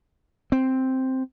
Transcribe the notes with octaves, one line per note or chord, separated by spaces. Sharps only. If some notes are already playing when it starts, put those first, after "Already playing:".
C4